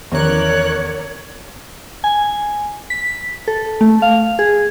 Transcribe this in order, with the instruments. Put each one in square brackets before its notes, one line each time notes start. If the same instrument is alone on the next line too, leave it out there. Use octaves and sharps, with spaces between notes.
[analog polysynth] E2 F#6 [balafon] D#3 F3 C#4 [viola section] A#4 D5 [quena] C#5
[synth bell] G#5
B6
A4
A3
F5
G#4